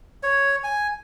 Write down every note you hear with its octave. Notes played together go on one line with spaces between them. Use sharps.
C#5
G#5